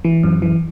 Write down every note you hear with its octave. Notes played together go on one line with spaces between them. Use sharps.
E3
F#2
E3